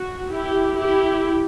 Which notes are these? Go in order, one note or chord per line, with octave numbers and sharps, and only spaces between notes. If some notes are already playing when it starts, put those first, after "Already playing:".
Already playing: F#4
E4 G4
E4 G4